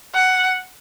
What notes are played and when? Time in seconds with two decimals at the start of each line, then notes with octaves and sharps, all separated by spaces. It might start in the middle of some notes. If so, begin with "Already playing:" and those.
0.15 F#5